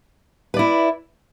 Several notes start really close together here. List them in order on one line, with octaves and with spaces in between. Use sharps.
B4 D5 E4